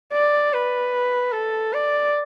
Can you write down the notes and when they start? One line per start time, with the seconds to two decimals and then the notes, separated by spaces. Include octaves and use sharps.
0.12 D5
0.53 B4
1.33 A4
1.74 D5